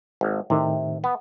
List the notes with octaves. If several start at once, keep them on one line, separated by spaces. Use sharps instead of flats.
G#1
A2 C3 D#3
B3